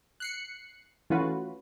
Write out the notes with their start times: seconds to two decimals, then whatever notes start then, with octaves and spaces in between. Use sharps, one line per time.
0.20 F#6 C7 C#7
1.10 E3 A3 C#4 F4 F#4 B4